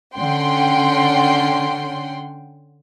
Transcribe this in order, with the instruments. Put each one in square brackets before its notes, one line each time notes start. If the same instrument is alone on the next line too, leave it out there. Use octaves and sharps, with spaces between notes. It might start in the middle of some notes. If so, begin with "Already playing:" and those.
[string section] D3 C#4 F#5 G5 C6